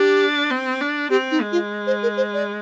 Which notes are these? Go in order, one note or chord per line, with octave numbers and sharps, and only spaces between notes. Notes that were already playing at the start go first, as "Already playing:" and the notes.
Already playing: D4 G4
C4
D4
C4 G4
D#4
G#3
F4
C5
A#4
C5
D5